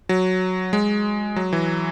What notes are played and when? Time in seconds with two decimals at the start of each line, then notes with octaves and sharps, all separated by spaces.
0.09 F#3
0.73 G#3
1.36 F#3
1.53 E3